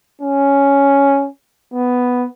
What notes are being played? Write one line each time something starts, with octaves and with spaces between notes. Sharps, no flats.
C#4
B3